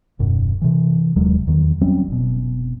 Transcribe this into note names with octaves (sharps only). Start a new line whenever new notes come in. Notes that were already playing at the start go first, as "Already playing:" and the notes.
D#1 F#2 B2
C3 E3
D#1 D#2 F#3 G#3
E2 D#3
F#3 G3 C4 C#4
F1 B2